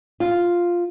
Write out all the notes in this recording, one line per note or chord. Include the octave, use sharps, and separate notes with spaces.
F4